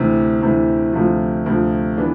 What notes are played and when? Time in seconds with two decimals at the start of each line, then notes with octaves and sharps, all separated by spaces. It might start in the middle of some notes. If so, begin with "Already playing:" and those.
Already playing: D2 C3 E3
0.42 D2 C3 E3
0.93 D2 C3 F3
1.46 D2 C3 F3
1.97 E3 B3 D4